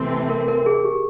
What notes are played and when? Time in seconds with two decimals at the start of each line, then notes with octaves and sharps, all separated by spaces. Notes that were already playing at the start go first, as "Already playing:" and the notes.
Already playing: C3 E3 A3 C4
0.29 A#4
0.48 A#4
0.66 G#4
0.84 G4